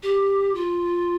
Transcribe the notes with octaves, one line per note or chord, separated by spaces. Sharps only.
G4
F4